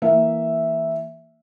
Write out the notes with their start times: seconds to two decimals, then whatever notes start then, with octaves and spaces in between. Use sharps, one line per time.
0.02 E3 A#3 E5